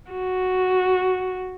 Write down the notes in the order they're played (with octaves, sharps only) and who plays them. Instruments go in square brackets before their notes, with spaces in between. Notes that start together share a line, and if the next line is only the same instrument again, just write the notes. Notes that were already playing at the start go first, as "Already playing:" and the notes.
[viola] F#4